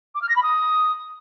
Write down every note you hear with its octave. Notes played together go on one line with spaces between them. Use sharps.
D6
F6
A#6
B5
D#6